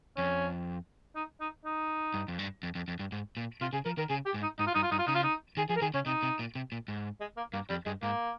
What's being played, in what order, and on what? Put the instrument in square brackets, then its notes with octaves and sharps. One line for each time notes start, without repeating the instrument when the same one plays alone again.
[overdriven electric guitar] F2 [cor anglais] C#4
[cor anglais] D#4
D#4
D#4
[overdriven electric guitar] G2
F2
G2
F2
F2
F2
G2
G#2
A#2
[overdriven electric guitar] C3 [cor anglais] F4
[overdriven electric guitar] C#3 [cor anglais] G#4
[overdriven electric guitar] F3 [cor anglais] A#4
[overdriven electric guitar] D#3 [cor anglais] A#4
[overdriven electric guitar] C#3 [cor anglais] G#4
[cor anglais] G4
[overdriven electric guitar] G#2
[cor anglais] D#4
[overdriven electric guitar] G#2 [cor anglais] D#4
[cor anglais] F4
[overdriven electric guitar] G2 [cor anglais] D#4
[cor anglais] F4
[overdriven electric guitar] G2 [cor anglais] D#4
[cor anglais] F4
[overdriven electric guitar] C#3 [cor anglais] D#4
[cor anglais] F4
D#4
[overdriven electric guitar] D#3 [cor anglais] G#4
[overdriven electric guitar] F3 [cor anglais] G#4
[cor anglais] A#4
[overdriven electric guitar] D#3 [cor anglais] G#4
[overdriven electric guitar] C#3 [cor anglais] C#4
[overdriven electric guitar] C3 [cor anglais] D#4
[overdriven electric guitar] C3
A#2
C3
A#2
G#2
[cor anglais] G#3
A#3
[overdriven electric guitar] G2 [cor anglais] A#3
[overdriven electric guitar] F2 [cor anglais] G3
[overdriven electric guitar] G2 [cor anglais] G#3
[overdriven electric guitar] G#2 [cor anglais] A#3